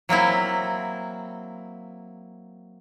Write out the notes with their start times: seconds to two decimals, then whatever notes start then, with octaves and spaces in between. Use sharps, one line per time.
0.09 F#3 A#3 C4 E4